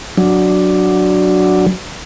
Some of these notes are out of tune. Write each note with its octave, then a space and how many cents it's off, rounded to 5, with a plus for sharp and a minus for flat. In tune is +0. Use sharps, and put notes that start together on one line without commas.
F#3 +0 D4 +0